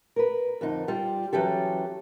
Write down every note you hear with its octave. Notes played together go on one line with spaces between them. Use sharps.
A#4 B4
F2 D3 D#4
G3 F4 G5
E3 F#3 C#4 G4 A4